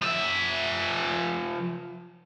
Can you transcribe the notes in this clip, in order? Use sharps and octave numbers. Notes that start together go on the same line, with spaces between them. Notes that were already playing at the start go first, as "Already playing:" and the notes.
F3 E5